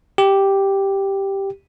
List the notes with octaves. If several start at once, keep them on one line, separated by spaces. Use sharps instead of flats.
G4